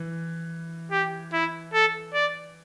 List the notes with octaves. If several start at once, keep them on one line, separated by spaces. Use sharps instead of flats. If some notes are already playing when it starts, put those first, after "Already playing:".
Already playing: E3
G4
E4
A4
D5